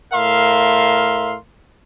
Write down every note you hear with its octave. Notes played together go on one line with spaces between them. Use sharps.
A2 A#4 E5 F5 C6